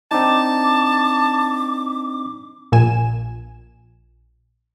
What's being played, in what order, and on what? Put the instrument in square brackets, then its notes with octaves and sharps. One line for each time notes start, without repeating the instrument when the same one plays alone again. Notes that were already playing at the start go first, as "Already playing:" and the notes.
[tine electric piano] C4 D4 D#4 [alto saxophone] A5 [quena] D6
[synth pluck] A#1 A#2 G#5 E7